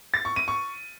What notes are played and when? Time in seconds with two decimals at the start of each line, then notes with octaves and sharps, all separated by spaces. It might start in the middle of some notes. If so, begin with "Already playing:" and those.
0.14 A6
0.25 C#6
0.36 D#7
0.48 C#6